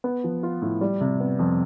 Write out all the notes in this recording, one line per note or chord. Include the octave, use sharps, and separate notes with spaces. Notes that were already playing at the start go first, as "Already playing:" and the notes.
B3
F3
F4
A2
G3
C3
B3
F2